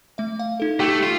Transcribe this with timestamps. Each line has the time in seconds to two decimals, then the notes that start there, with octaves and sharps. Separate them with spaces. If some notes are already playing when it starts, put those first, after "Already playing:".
0.18 A3 E5
0.39 F5
0.60 D#4 A4
0.80 A3 G4
1.03 F4